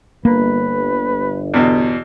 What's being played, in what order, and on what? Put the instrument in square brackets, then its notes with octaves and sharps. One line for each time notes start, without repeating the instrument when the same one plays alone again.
[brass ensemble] G1 [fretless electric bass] A#3 [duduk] B4
[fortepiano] E2 B2